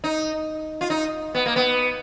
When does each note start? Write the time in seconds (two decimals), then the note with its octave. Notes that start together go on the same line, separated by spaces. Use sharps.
0.04 D#4
0.81 F4
0.90 D#4
1.35 B3
1.46 A#3
1.56 B3